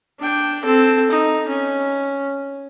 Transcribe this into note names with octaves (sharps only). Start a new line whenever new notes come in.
D4 G5
C4 A4
D#4
C#4